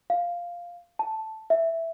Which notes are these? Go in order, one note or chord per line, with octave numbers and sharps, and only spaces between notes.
F5
A5
E5